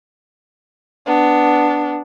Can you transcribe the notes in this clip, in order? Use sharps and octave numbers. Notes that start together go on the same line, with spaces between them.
B3 D4